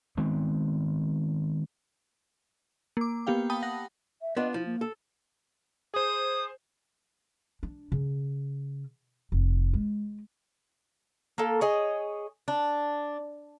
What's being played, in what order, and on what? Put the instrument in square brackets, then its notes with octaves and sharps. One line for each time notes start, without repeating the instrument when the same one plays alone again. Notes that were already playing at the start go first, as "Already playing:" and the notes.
[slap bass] D#3 G#3 B3 C4
[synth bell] A#3 D6
A#3 B3 G4 F5 G5
G5 A5 B5 D#6
F#5 A#6
[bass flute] E5
[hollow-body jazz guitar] B3 D4 F4 [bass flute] D#5
[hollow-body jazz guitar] F3 [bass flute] E4
[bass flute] A#3
[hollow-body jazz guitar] A4
[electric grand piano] G#4 C5 [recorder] D#6
[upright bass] D4
C#3
F1
G#3
[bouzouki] A#3 A4
G#4 C#5 D#5
D4